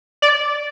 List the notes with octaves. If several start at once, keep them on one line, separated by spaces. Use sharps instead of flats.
D5